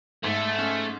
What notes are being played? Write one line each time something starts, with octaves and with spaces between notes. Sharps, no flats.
G#2 A3
C#4